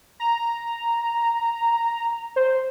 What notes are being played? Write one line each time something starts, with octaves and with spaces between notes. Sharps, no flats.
A#5
C5